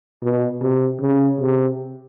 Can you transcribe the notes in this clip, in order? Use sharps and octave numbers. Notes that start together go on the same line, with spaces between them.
B2
C3
C#3
C3